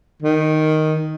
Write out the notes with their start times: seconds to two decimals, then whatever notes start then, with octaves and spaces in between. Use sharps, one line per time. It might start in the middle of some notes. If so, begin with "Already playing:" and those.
0.22 D#3